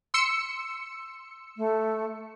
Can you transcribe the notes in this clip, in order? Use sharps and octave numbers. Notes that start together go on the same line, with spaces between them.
C6 E6 C#7
A3